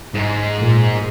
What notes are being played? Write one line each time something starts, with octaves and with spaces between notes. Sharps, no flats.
G#2 G#3
A#2